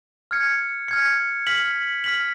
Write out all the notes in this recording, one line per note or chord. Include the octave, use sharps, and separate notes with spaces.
F6 G#6 C#7
F6 G#6 C#7
F6 B6 F#7
F6 B6 F#7